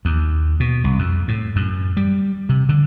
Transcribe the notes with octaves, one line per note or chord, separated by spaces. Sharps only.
D#2
B2
C2
F2
A2
F#2
G3
C3
D3